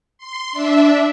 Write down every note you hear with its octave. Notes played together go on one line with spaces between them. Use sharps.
C6
D4 E5